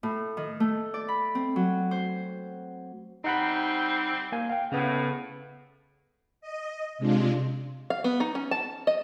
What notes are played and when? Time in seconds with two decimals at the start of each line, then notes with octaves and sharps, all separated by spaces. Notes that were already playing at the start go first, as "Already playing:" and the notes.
0.03 A2
0.37 D#3
0.60 A3
0.94 D5
1.08 B5
1.35 C4
1.56 F#3
1.91 C5
3.24 G3 C4 D#4 F#5 B5
4.32 A#3 G#5
4.50 F5 G5
4.72 A2 C#3 B3
6.41 D#5
6.98 C3 G#3 D4 F4
7.90 F5
8.04 B3
8.20 D#4
8.35 C#4
8.51 A5
8.87 D#5